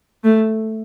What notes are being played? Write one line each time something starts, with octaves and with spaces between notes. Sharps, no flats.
A3